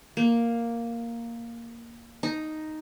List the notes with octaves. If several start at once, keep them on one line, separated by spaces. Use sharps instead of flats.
A#3
D#4